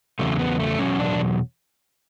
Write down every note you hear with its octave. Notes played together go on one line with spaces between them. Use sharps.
E2 C#3 F#3 A3
B3
A3
E2 B2 F#3 C#4
D4